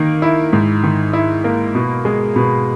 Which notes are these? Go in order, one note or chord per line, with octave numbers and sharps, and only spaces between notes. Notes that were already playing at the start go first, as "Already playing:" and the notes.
Already playing: D#3 A#3
E4
G#2
D#3
E4
A#3
B2
G#3
B2